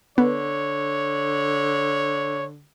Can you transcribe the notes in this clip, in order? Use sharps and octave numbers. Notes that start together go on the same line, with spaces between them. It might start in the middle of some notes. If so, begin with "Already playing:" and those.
D3 B3 C#5